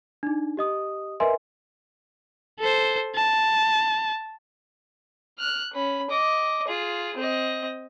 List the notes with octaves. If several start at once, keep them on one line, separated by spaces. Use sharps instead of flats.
D4 D#4
G4 D#5 D#6
A#4 B4 D#5 E5 G#5 C6
A4 C5
A5
F6 F#6
C#4 B5
D#5 D6
F4 G#4
C4 D#5